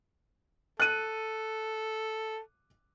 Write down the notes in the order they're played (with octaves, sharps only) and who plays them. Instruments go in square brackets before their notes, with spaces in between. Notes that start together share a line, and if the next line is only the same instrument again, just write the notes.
[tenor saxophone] A4 [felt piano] F#6 D#7